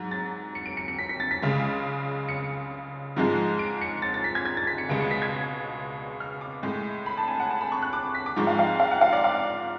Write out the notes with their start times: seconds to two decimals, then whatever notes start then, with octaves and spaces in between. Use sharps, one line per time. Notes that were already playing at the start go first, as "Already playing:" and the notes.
Already playing: G#2 F#3
0.11 A6
0.55 C#7
0.66 D7
0.77 C#7
0.88 C#7
0.99 B6
1.09 B6
1.20 A6
1.31 B6
1.42 C#2 C#3 G#3
2.29 C#7
3.16 G#2 F3 G#3
3.59 D7
3.81 C#7
4.02 A6
4.14 A6
4.24 B6
4.35 G#6
4.45 G#6
4.57 A6
4.67 B6
4.78 C#7
4.89 C#2 B2 G#3 D7
5.01 C#7
5.11 B6
5.22 G#6
6.20 F6
6.41 D6
6.63 A2 G#3
7.06 B5
7.17 A5
7.28 G#5
7.40 F#5
7.50 A5
7.61 B5
7.72 C#6
7.82 F#6
7.93 D6
8.15 B6
8.26 D6
8.36 G#2 F3 G#3 C#6
8.47 F5
8.59 F5
8.80 F5
8.91 F#5
9.01 F5
9.13 D5
9.24 F5